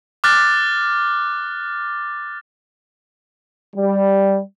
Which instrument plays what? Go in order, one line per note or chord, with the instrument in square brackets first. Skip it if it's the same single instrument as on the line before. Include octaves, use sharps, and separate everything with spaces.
[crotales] D6 F6 F#6 A6
[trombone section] G3